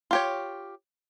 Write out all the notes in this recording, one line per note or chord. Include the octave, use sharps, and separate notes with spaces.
F4 G4 C#5